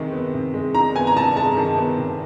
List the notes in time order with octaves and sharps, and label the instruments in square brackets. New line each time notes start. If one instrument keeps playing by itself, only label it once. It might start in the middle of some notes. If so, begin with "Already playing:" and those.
Already playing: [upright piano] C3 D#3 G#3
B3
C3
G#3
D#3 A#5
B3 G#5
A#5
C3 A5
G#3 A5
D#3
B3
C3